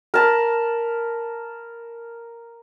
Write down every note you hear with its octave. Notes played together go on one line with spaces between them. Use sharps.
A#4 A5 B5